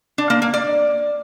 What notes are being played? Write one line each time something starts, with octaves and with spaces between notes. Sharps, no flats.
D4
A#3
A#3
D5